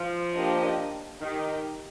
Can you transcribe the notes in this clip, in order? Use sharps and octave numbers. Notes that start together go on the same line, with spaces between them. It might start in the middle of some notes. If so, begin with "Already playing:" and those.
Already playing: F3
A#3 D4 G4 C5 D#5
D#3 D#4 G4 A#4